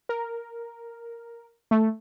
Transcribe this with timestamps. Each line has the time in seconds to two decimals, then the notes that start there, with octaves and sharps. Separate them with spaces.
0.09 A#4
1.71 A3